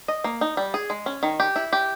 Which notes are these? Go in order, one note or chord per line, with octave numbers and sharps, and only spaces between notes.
D#5
A#3
D#4
G3
G#4
G#3
C#4
D#3
G4
E4
G4